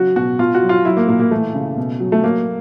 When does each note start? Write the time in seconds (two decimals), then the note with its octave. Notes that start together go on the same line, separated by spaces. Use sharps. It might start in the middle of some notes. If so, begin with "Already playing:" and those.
Already playing: C#3 F#3 F#4
0.16 B2 F#4
0.39 B2 F4
0.54 F#4
0.62 F#3
0.69 F4
0.85 F#3 E4
0.97 A#3
1.08 A#2 A#3
1.20 A#3
1.31 E3 A3
1.55 C#3
1.77 B2
2.00 F#3
2.12 A3
2.23 F#3 A#3